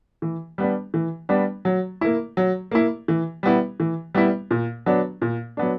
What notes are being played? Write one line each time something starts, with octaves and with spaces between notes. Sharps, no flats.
E3
G3 B3 D4
E3
G3 B3 D4
F#3
A#3 E4
F#3
A#3 E4
E3
G3 B3 E4
E3
G3 B3 E4
A#2
F#3 B3 D4
A#2
F#3 B3 D4